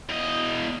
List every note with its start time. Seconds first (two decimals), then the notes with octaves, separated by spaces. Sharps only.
0.09 E2 D#5